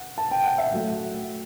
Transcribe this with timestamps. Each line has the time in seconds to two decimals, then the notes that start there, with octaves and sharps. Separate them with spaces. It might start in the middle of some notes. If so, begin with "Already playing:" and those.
Already playing: F#5
0.18 A5
0.31 G5
0.44 F#5
0.58 E5
0.71 A2 F#3 A3